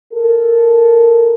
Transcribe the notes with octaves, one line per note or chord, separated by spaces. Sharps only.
A4 A#4